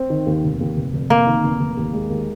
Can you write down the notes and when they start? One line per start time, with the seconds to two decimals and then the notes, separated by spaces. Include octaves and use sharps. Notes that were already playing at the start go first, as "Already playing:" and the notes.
Already playing: C4
0.10 D#3
0.26 D#2
0.43 F1
0.60 D#2
0.76 F1
0.93 F1
1.10 F1 A#3
1.27 D#3
1.43 F1
1.60 F1
1.77 D#2
1.93 G#3
2.10 D#2